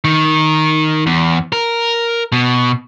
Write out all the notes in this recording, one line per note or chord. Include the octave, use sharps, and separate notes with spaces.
D#3
E2
A#4
B2